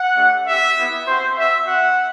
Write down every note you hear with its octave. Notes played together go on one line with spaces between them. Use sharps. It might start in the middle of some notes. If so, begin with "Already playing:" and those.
Already playing: F#5
A3 D4 G4
C4 G4 E5
B3 E4 G4
C4 F#4 C5
C4 F#4 E5
C4 F#4 F#5